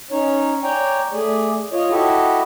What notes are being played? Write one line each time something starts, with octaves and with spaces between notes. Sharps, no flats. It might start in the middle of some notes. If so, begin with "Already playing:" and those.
C#4 D#4 C#5
C#5 D5 G5 G#5 A#5
A3 G#4 D5
F4 C#5 D#5
E4 F#4 G4 A4 D#5